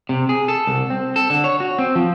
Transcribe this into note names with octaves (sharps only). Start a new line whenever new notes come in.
C3
G#4
A4
C2
C4
A4
D3
C#5
F#4
C4
F3